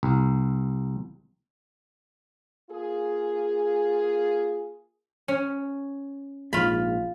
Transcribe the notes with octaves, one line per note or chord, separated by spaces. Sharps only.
C2
A#3 F4 G#4
C#4
A#1 G#2 F4 B5